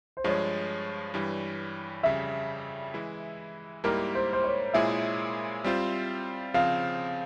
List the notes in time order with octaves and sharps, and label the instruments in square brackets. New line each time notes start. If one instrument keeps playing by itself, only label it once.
[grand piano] C5
[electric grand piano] G2 F3 G#3 [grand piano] C#5
[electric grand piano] G2 E3 G3
[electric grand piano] F2 C#3 G3 [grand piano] E5
[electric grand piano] E3 G#3 E4
[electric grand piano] G#2 G3 A#3 E4 G4 [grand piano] A#4
[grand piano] C5
C5
C#5
[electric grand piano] A#2 G#3 E4 G#4 [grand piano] E5
[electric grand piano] G3 C4 F4 C5
[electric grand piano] C#3 F3 C4 [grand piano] F5